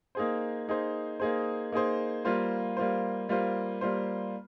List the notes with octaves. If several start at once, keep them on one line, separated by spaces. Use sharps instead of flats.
A#3 D#4 G#4 C5
A#3 D#4 G#4 C5
A#3 D#4 G#4 C5
A#3 D#4 G#4 C5
G3 A#3 F4 C5
G3 A#3 F4 C5
G3 A#3 F4 C5
G3 A#3 F4 C5